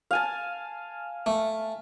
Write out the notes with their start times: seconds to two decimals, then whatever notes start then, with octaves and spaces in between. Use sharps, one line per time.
0.11 F5 G#5 A5
1.26 A3